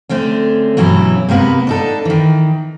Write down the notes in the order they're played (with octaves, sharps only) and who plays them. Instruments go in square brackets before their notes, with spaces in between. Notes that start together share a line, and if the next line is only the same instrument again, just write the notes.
[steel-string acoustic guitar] D3 A3 C4 C#4
G2 B2 E3 F#3 C#4 E4
C3 G#3 A#3 B3 B4
D4 D#4 A4
D#3 E3